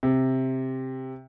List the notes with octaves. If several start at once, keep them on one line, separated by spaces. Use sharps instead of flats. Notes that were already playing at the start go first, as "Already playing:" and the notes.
C3